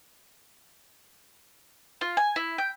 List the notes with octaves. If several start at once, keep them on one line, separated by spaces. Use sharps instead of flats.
F4
G#5
E4
G5